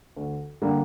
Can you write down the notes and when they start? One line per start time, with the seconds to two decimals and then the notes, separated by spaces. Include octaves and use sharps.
0.16 D2
0.62 D3 G3 A#3